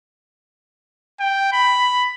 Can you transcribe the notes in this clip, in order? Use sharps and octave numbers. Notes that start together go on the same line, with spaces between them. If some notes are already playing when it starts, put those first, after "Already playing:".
G5
B5